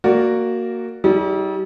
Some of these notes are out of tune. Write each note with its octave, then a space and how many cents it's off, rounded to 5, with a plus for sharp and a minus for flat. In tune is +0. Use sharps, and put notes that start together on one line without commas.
A#3 -10 F#4 +0 D5 +0
G3 -30 D#4 +45 G#4 +0